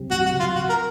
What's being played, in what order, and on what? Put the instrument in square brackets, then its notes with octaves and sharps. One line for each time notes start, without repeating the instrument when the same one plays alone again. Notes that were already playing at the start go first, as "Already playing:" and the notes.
Already playing: [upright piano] C2 C3 F#3
[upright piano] C2 [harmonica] F#4
[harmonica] F#4
[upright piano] C3 F#3
[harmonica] F4
[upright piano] C3 [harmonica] F#4
[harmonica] A#4